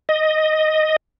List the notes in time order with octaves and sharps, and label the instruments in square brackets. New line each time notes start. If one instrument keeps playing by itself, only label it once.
[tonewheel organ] D#5